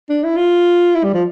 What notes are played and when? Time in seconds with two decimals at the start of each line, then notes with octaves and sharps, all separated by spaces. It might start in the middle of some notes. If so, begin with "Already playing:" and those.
0.09 D4
0.24 E4
0.37 F4
0.95 E4
1.04 G3
1.14 F3